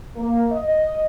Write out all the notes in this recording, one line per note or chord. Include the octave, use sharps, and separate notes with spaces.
A#3
D#5